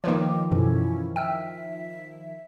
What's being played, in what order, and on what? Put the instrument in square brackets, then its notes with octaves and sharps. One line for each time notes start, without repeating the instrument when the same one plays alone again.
[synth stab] D#3 F3 [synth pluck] A#3 B4 C#5 [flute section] D#5 G5 D6
[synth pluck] F#2 B2 E3 [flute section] C#4 E4 A4
[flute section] E5 [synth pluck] G5 E6 F6